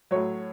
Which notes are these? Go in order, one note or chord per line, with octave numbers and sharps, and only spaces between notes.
A2 F#3 C#5